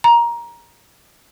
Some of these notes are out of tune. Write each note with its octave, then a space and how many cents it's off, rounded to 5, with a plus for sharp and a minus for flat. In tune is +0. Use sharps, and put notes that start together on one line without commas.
A#5 +15